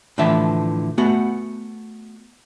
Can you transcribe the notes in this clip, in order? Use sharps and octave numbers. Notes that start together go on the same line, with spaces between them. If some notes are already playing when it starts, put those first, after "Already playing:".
A2 D3 E3 F3 E5 A5
A3 B3 F#4